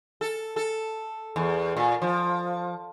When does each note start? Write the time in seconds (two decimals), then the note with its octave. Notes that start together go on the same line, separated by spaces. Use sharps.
0.21 A4
0.56 A4
1.36 E2
1.77 A#2
2.02 F3